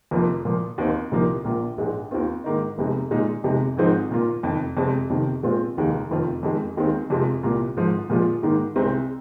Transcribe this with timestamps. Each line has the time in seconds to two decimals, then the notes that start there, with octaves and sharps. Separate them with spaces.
0.11 F1 F2 F3 A#3 F4
0.45 A#2 F3 A#3 F4
0.78 D#2 D#3 C4 D#4
1.11 C2 A#2 F3 A#3 D#4
1.44 A#1 A#2 A#3 F4
1.78 A#1 G#2 G#3
2.11 D#2 D#3 C4 F4
2.44 G#2 D#3 A#3 D#4
2.78 F1 F2 C3 G#3 D#4
3.11 A#2 G#3 D#4
3.44 F2 C3 G#3 D#4
3.77 G#1 G#2 F3 C4 D#4
4.11 A#2 A#3 F4
4.43 F1 F2 D#3
4.77 F2 C3 G#3 C4
5.10 F2 C3 D#3
5.43 A#2 G#3 C4 F4
5.77 F1 D#2 D#3 G#3
6.10 F1 F2 D#3 C4 F4
6.43 F2 D#3 G#3
6.77 D#2 D#3 G#3 C4 D#4
7.10 F2 C3 G#3 F4
7.43 C2 A#2 A#3 F4
7.76 G#1 G#2 F3
8.10 A#2 F3 G#3 F4
8.43 G#2 D#3 A#3 D#4
8.76 C2 C3 G#3 C4